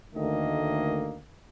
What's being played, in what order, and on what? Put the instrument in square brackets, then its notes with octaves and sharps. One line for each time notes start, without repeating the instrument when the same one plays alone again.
[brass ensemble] D2 D#3 A3 A#3 D#5